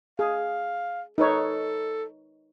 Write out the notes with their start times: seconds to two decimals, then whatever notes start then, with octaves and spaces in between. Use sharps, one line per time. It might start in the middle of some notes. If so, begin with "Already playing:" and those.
0.19 G#4 F5
1.18 D#4 A4 B4 C#5